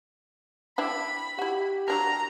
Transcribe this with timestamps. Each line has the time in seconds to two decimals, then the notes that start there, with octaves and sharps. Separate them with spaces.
0.78 D4 E4 G4 B5
1.39 E4 F#4 G4
1.88 F#3 D4 A#4 A#5